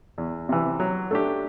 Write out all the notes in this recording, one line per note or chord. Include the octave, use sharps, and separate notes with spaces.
E2
C3 E3
F#3
A3 D4 G4